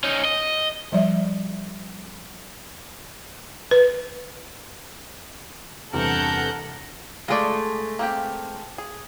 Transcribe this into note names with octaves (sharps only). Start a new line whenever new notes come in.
C#4 D#4
D#5
F3 G3 D5 E5
B4
E2 G2 C3 A4 A#4 F#5 G6
G#3 A3 F4 G#4 D5
A#3 C4 G4
G#4